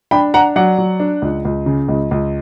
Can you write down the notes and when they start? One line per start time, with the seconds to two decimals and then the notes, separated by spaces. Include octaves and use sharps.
0.11 D4 G5 B5
0.34 D4 F#5 A#5
0.56 F#3 D5 F#5
0.78 F#3
1.00 D4
1.22 C#2
1.45 C#2
1.66 C#3
1.88 C#2
2.11 C#2